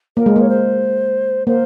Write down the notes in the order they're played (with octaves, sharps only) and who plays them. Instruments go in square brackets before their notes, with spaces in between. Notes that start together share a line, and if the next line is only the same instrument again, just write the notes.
[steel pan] A#3 [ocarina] A#4
[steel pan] G#3
[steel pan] A#3 [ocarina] C#5
[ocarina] C5
[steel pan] A#3 [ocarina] C5